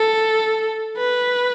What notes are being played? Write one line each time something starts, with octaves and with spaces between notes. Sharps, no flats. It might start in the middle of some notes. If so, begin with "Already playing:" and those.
Already playing: A4
B4